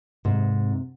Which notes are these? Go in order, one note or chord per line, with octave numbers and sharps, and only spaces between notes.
G#2 C3